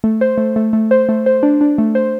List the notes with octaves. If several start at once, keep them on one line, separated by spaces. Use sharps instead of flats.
A3
C5
A3
A3
A3
C5
A3
C5
D4
D4
A3
C5